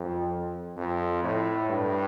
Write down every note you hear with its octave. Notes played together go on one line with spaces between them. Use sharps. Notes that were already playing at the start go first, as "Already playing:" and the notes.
Already playing: F2
F2
A2
G2